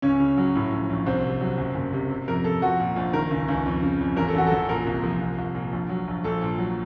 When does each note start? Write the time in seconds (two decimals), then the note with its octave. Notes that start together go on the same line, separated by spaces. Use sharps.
0.02 C#2 C#4
0.20 C#3
0.37 F#3
0.55 A2
0.72 A#1
0.90 A#1
1.06 C2 C4
1.24 C3
1.41 F#3
1.58 F#1
1.75 F#1
1.93 C3
2.11 C3
2.28 F2 A#4
2.44 F2 A4
2.62 F3 F#4
2.80 A#2
2.96 A#1
3.13 D#3 A#4
3.31 C#2
3.48 C#2
3.66 F2
3.83 C#3
4.00 F2
4.17 A1 A#4
4.28 A4
4.35 A1 F#4
4.47 A1 A4
4.69 A#2 A#4
4.87 C2
5.03 F3
5.21 C2
5.38 C2
5.55 A#2
5.72 A#1
5.89 F#3
6.07 A#1
6.24 A#1 A4
6.41 A#2
6.58 F#3